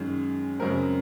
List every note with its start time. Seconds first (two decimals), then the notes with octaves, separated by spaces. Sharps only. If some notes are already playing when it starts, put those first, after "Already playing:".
Already playing: F#2 D#3 G#3 G#4
0.59 F#2 C#3 G#3 C4 A#4